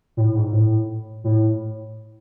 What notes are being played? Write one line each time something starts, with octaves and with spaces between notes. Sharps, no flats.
A2
G#2
A2
A2